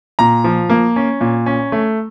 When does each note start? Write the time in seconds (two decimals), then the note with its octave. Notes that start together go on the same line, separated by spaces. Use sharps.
0.19 A#2 A#5
0.44 F3
0.70 A#3
0.96 C#4
1.21 A#2
1.46 C#4
1.72 A3